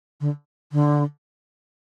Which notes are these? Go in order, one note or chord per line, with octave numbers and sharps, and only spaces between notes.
D3
D3